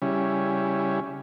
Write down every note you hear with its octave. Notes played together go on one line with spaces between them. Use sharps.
C#3 G3 C#4 E4